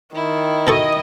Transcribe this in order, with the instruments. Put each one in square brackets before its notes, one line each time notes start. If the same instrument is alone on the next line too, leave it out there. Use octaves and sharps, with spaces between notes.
[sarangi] D#3 [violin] E4
[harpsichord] B2 A4 C#6 [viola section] D#5